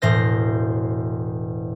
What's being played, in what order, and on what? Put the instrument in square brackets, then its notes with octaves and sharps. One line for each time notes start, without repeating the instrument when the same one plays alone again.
[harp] E1 A2 C5 A#6